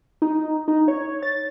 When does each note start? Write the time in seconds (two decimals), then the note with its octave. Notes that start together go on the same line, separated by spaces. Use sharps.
0.22 D#4
0.68 D#4
0.88 C#5
1.23 A6